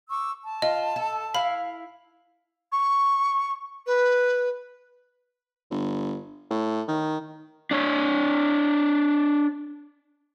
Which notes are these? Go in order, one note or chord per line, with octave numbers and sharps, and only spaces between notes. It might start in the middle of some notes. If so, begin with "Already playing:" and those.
C#6 D6 E6
A5
F4 D#5
A4
E4 F5 B5
C#6
B4
G1
A2
D#3
D4 C#5